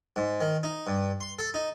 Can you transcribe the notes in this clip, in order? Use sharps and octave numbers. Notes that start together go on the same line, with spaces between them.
G#2
D#3
D#4
G2
C6
A4
D#4